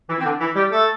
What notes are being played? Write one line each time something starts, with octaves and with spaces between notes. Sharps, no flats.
E3 E4
C4
D3 D4
E3 E4
G3 G4
A3 A4